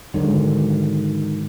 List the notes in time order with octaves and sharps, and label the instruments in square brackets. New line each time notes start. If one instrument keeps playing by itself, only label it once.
[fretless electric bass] G#2 D3 D#3 F#3